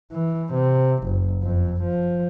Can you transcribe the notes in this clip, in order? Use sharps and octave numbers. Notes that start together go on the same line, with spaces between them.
E3
C3
F#1
F2
F3